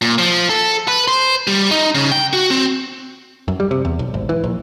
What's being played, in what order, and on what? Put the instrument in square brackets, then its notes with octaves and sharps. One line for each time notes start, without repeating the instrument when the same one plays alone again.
[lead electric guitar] A#2
F3
A4
B4
C5
G3
D#4
C#3
G5
F#4
C4
[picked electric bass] F#2
G3
C3
E2
B1
G#1
E3
A#1